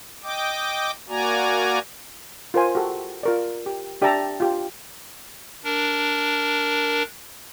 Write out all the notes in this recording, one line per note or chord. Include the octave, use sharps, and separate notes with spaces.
D#5 G5 D6
A#3 F#4 D5 G#5 A#5
F4 A#4 C5 G#5
F#4 G4 A4
F4 A#4 D5
G4
D4 G4 D5 E5 A5 A#5
F4 G4
D4 A#4